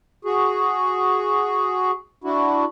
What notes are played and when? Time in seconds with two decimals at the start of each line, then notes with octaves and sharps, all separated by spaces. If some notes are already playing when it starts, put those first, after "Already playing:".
0.25 F#4 G#4
2.24 D4 E4 F#4